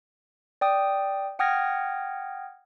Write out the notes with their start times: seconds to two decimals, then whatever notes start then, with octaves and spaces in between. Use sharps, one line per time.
0.61 D5 G5 D#6
1.39 F#5 G5 D#6 F6 G#6 A#6